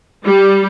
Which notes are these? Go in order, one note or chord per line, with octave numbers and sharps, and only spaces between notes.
G3